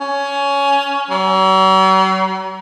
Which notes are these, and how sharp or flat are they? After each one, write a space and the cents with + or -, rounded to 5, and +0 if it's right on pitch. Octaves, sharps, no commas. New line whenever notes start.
C#4 +15
F#3 +45